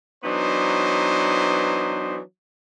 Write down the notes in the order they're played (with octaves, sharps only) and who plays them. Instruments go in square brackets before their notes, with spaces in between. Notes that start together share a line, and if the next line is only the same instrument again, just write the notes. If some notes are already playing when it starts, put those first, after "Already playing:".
[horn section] E3 F#3 B3 D4 D#4 C5